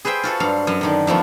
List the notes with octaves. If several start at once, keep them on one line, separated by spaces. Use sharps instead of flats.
G#4 B4 C5 E5 G5
F4 F#4 A4
G2 F#3 F5
F#2 F#3 D#5
F#2 D3 D#3
F2 F3 A3 B3